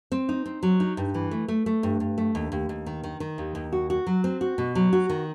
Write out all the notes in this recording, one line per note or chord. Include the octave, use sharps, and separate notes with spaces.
C4
D#4
C4
F#3
D#4
G2
E3
A3
A3
A3
G2
G2
A3
D#2
D#2
D#2
D#3
D#3
D#3
D#2
D#2
F#4
F#4
F#3
C4
F#4
B2
F#3
F#4
D#3